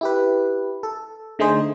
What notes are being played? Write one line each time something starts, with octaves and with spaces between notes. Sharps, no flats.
E4 G4 B4
A4
D3 A3 D#4 G#4 C5